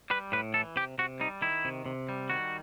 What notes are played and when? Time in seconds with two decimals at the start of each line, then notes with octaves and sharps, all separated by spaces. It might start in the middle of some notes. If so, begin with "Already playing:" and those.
0.10 G3 B4
0.32 A2 B4
0.54 E3 A4
0.76 C3 G4
0.98 C3 F#4
1.20 G3 D#4
1.42 D#3 E4
1.65 C3
1.86 C3
2.09 G3
2.30 D#3 F#4